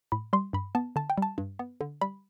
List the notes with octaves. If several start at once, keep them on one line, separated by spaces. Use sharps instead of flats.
A2 B5
G3 C6
G2 B5
B3 A5
D3 A5
G5
G3 A5
G2
B3
D3
G3 B5